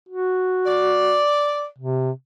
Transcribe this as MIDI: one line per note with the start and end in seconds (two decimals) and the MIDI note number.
0.09 1.20 66
0.66 1.66 74
1.78 2.10 48